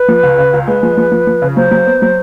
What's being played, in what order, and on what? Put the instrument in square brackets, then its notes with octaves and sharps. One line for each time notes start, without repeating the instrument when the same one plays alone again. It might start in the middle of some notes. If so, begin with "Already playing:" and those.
Already playing: [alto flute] B4
[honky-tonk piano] F3
C#2
C#3
C#2
[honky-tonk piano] G#3 [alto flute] B4
[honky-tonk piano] F3
F3
F3
F3
C#3
[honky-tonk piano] F#3 [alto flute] C5
[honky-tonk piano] F#3
B3
F#3